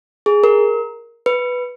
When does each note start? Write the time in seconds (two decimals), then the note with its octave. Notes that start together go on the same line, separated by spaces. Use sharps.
0.26 G#4
0.44 A#4
1.26 B4